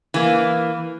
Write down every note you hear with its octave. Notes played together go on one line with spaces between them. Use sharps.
E3 A#3